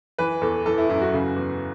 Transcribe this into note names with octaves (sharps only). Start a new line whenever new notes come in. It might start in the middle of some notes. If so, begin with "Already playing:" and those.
E3 B4
E2 A4
E3 A4
E4
F#2 E4
F#4
C#3
E2